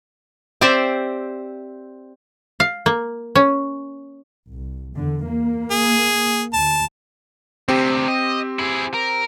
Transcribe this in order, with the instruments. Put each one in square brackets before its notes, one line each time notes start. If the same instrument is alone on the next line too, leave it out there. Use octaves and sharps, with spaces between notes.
[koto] C4 G4 C5 D5 E5
F5
A#3
C#4
[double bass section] C2
E2 D3
A#3
[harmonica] G#4
[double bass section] D2 [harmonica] A5
[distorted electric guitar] D2 C3 [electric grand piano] C4 G4
[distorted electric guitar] D#5
E4 G#4
A#4